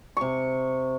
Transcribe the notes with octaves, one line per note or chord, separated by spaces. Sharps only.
C3 C#6